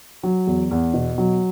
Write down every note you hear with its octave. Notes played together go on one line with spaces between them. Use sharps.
F#3
E2
E2
B2
F#3